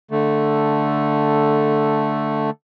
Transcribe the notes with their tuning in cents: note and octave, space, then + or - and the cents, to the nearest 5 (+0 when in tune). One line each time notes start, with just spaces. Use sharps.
D3 +0 A3 +0